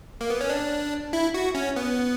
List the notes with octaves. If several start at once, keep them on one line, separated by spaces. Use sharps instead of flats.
A#3
B3
C#4
D4
E4
F#4
C#4
B3